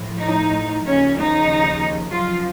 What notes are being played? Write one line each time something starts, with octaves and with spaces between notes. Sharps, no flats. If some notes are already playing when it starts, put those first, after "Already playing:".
Already playing: A2 F3
D#4
D#2 C#3 F3 C#4
D#4
F#2 F3 F4